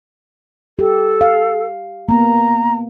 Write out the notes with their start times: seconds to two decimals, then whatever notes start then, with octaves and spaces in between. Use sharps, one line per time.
0.79 G4 A4
1.21 F5
2.09 A#3 B3 A#5